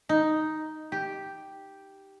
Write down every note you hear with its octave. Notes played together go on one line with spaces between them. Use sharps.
D#4
G4